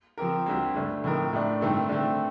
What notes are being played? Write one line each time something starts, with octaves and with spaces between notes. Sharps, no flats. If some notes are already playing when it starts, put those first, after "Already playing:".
F3 C4 G4 A#4
D2 D3 G3 C4
G2 D3 A3
A2 F3 C4 D#4 A#4
A2 A3 D4
G2 D#3 A3 C4
D3 A3 C4